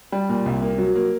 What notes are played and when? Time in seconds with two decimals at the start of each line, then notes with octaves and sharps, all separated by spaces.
0.12 G3
0.29 A#2
0.46 C2
0.62 A#3
0.78 F#3
0.95 A#3